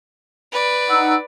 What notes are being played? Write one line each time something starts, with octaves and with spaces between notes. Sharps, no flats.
B4 D5
D#4 F#5 E6